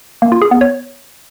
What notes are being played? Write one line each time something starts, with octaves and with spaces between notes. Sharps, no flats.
A#3
F4
G#4
B3
C#5